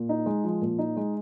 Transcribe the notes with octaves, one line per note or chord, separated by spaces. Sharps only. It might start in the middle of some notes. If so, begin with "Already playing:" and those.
Already playing: A#2
D#4
G#3
F3
A#2
D#4
G#3